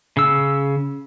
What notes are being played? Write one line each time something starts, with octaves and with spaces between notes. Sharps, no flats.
C#3 E6